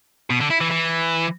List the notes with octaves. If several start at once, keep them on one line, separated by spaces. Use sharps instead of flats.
B2
D3
E4
E3
E3